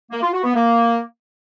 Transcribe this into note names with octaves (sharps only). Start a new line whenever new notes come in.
A#3
F4
F#4
B3
A#3